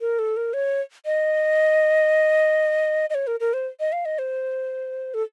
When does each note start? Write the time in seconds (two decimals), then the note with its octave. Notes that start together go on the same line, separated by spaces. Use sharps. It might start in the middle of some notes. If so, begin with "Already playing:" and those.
0.01 A#4
0.19 A4
0.36 A#4
0.53 C#5
1.05 D#5
3.10 D#5
3.14 C#5
3.27 A#4
3.40 A#4
3.53 C5
3.80 D#5
3.92 F5
4.05 D#5
4.18 C5
5.14 A4